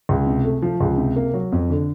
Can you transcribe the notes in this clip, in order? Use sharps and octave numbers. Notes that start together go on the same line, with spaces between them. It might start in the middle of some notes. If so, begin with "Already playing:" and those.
C#2
C3
A3
F3
C#2
C3
A#3
F#3
F2
D3